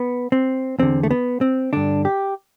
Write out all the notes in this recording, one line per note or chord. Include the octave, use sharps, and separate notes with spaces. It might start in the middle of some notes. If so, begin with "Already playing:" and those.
Already playing: B3
C4
E2 D3 C4
A3
B3
C4
G2 D3 D4
G4